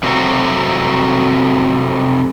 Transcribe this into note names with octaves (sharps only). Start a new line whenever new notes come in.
F2 C3 F#3 A3 C4 F#4